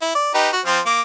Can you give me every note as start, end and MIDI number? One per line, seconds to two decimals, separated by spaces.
0.01 0.11 64
0.15 0.34 74
0.34 0.49 63
0.34 0.49 67
0.34 0.49 71
0.52 0.60 66
0.66 0.80 53
0.66 0.80 60
0.66 0.80 65
0.86 1.01 58
0.86 1.01 86